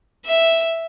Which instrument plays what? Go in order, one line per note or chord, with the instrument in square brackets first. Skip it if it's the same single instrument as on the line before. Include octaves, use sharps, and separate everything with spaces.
[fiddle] E5